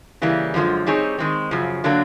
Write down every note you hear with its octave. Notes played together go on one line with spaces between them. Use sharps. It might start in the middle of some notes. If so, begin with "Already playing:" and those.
C#3 E3 G3 A#3
F#2 D3 F3 G#3
G3 C4 D#4 G#4 C#5
D#3 G#3 C4
F#2 C#3 F3
D3 F#3 A#3 D4